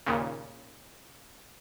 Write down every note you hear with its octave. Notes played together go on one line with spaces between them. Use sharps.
D#2 A#2 C#3